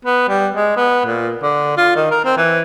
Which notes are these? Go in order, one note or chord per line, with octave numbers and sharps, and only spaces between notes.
B3
G3
G#3
B3
A#2
D3
F4
D#3
A#4
C4
E3